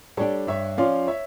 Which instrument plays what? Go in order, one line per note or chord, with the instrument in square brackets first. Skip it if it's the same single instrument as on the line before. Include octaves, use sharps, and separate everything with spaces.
[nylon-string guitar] G3 D4 G4 [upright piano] A4 C#5
[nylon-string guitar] G2 [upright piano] C#5 E5
[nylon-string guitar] F3 C#4 F4 [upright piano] D5 F5
[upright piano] C#5 E5